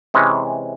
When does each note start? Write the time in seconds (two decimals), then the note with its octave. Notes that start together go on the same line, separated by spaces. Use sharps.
0.14 C3 E3 G#3 C#4